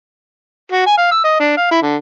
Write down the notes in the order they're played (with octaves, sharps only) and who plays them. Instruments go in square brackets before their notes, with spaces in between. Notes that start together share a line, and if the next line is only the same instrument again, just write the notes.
[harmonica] F#4
G#5
F5
E6
D#5
D4
F5
E4
D3